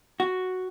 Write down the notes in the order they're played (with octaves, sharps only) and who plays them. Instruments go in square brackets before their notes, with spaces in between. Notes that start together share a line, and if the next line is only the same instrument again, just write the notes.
[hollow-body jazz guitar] F#4